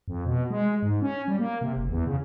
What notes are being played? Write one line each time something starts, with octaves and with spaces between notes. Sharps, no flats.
F2
B2
G#3
G#2
C#4
G3
A#3
C3
F#1
E2
C#3